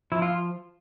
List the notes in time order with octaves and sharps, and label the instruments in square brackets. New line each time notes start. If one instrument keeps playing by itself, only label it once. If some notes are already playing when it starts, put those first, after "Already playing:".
[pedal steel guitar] F3 E4
F4